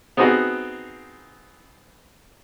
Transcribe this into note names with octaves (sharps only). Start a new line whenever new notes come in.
B3 C4 D#4 F#4 G#4